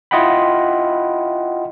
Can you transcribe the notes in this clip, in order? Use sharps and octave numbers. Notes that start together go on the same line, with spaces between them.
E4 F4 D#5 F#5 G5 B5